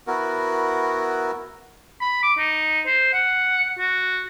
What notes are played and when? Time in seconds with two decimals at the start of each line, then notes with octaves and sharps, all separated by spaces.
0.07 B3 E4 F#4 A#4
2.01 B5
2.23 D6
2.39 D#4
2.86 C5
3.13 F#5
3.79 F#4